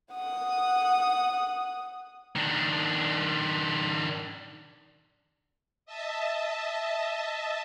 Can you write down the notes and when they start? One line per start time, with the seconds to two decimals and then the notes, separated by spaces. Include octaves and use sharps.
0.12 F#5 D#6
2.36 D#3 D4
5.86 D#5 E5 A5